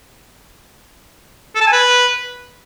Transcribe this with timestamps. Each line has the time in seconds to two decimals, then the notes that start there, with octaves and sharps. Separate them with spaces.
1.55 A4
1.61 A5
1.67 G#5
1.73 B4